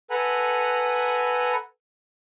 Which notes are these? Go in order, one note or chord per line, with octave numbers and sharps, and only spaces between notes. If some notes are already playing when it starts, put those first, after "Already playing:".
A4 B4 F#5 G#5 A#5 B5